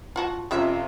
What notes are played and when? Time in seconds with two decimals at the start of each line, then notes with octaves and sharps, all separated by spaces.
0.16 F4 F#4 A5
0.51 F2 C3 G#3 C#4 F4 E5